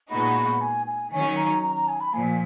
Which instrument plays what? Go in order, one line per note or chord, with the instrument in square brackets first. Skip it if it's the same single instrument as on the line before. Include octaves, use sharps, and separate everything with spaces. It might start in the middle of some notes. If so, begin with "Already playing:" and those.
[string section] A#2 G#3 B3 D#4 F#4 [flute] B5
[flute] G#5
G#5
[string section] D#3 F#3 C#4 [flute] G#5
[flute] A#5
A#5
A#5
G#5
B5
[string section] A#2 F3 [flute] G#5